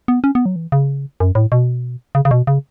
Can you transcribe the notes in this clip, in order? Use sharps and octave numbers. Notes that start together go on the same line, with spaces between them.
B3
C#4
B3
F#3
E3
C#3
F#2
A2
B2
C#3
C#3
B2
C#3